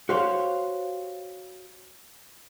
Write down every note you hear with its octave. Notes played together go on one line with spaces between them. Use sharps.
F#4 G4 C5 C#5 F5